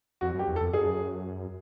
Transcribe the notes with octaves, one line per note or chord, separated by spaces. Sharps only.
F2 F#4
F#2
G4
E2
A4
F2
F#2 G#4